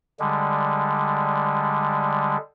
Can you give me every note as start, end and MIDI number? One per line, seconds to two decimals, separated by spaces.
0.20 2.37 50
0.20 2.37 55
0.20 2.37 56